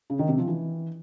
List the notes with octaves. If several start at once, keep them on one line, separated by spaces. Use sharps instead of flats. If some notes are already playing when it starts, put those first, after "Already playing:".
C#3
D#3
C3
F3
E3